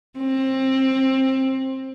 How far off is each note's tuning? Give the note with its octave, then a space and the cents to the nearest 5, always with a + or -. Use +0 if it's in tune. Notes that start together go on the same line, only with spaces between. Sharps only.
C4 +20